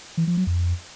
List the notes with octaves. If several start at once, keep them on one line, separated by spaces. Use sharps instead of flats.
E3
F3
F#3
F2